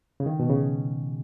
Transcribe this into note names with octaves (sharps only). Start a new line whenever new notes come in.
C#3
D#3
B2
C#3